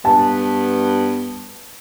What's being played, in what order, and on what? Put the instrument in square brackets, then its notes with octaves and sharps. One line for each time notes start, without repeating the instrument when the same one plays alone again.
[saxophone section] G2 B3 [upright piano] A5